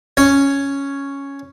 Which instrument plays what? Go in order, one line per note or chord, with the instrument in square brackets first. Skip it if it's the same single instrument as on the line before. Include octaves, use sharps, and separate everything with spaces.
[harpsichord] C#4 C#5